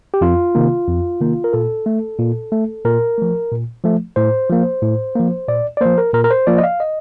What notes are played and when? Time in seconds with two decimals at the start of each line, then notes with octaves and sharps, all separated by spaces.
0.14 G4
0.21 F2 F4
0.55 C3 D#3 A#3
0.87 F2
1.20 C3 D#3 A#3
1.44 A#4
1.53 A#2 A4
1.86 A3
2.19 A#2
2.52 A3
2.85 A#2 A#4
3.18 F3 A3
3.51 A#2
3.84 F3 A3
4.16 A2 C5
4.50 F3 A#3
4.82 A2
5.15 F3 A#3
5.48 A#2 D5
5.77 D5
5.81 F3 A#3 C5
5.98 A#4
6.14 A#2 A#4
6.24 A#4
6.31 C5
6.47 F3 A#3 D5
6.58 D#5
6.63 F5
6.80 D#5